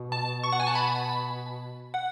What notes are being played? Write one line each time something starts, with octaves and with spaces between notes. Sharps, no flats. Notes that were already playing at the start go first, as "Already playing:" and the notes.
Already playing: B2
A5
C#6
F#5
G#5
A5
B5
F#5